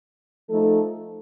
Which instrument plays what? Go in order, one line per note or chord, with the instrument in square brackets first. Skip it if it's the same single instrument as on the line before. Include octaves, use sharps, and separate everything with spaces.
[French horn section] F3 A3 D#4 A4